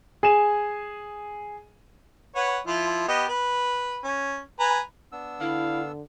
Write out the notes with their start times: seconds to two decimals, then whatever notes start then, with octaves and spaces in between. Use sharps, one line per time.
0.23 G#4 G#5 E7
2.36 B4 C#5 F#5
2.67 F3 E4 F4
3.08 B3 G4 D#5
3.29 B4
4.04 C#4
4.60 B4 G#5 A#5
5.12 B3 D4 E6
5.41 D3 E4 F5